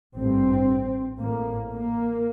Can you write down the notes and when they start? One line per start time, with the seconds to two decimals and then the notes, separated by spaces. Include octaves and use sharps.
0.16 A1 G2 C4
1.20 A1 A2 A#3
1.71 A#3